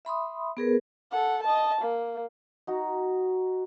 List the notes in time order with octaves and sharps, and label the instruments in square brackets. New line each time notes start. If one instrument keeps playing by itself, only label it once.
[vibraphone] E5 B5 C6 D#6
B3 G#4 A#4 B4
[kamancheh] A4 F#5
D#5 A5
A#3
[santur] D#4 F#4 A#5